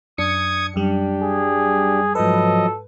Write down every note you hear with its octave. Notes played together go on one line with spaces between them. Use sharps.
F#2 D4 D#6 G#6 C#7
F#2 G3 D4 G4
G#4
G#2 F3 F#3 A4 B4 D#5